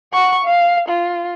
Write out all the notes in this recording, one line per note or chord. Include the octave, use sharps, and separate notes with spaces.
F#5 C#6
F5
F4